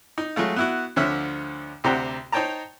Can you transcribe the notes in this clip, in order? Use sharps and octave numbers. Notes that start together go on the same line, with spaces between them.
D#4
F#3 G#3 A3 F4
B3 E4 F#4
D2 D3 F3 C#5 E5 F6
D2 C3 G4 C5 F#5 A#5
D#4 C5 C#5 G5 A5 A#5